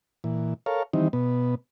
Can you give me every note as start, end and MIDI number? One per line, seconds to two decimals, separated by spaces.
0.24 0.54 46
0.24 0.54 52
0.66 0.83 69
0.66 0.83 70
0.66 0.83 73
0.66 0.83 77
0.93 1.08 51
0.93 1.08 52
0.93 1.08 55
0.93 1.08 60
0.93 1.08 63
1.13 1.55 47
1.13 1.55 59